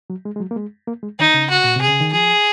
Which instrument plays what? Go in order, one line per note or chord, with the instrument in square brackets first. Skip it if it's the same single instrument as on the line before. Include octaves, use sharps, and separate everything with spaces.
[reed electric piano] F#3
G#3
G#3
F#3
A#3
G#3
A#3
G#3
[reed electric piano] D#3 [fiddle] D#4
[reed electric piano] C#3
[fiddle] F#4
[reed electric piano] A#2
C3
[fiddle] G#4
[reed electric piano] C#3
D#3
[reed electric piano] F3 [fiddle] G#4